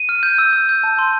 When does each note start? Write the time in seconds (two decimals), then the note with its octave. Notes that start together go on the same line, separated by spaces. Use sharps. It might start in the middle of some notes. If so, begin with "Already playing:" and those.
Already playing: D#7
0.09 F6
0.23 G6
0.38 E6
0.53 E6
0.69 G6
0.84 A5
0.99 C6